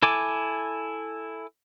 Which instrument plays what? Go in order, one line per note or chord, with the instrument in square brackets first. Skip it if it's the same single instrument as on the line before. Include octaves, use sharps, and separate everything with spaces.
[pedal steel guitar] E4 A4 G#5 D6